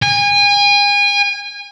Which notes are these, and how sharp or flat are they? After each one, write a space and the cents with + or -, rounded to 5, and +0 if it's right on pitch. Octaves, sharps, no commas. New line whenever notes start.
G#5 -30